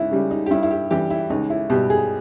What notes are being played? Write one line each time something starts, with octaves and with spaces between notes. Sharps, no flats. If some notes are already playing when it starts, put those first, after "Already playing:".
Already playing: C#2 D#4 E4
C#3 G3
D#4
G4
G2 E4
E4
G4
E3 G3 G4
E4
C#2 D#4
E4
B2 G3 G4
G#4